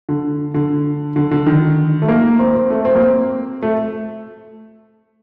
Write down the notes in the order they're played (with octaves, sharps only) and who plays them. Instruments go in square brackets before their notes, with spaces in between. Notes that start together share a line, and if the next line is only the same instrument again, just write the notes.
[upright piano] D3
D3
D3
D3
D#3
A3
A#3
C4
C4
A3
C4
A#3
C4
A3